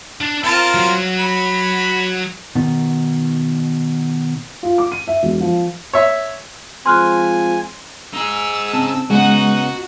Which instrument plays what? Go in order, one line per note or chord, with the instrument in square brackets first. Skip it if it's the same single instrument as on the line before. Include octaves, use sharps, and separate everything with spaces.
[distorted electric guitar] D4
[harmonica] C4 F4 A#4 [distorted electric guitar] G5 A5
[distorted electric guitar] F#3
[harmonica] B5
[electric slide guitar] B2 D#3
[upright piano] F4
D6
D#7
E5
E1
F3
[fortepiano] C#5 E5
[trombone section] F3 G#3 C4 [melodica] G#5 [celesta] C6 F6 F#6
[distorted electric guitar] D#4 G#4 [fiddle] E6
[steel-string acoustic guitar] C#3 [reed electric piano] C4 A5
[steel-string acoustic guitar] C#3 B3 [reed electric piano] G#3 [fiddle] D#4 F#5 [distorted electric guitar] F#4